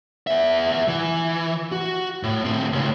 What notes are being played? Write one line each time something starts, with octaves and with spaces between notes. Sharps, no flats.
B3 E5
E3
F#4
A2
A2 C4
C#2 A2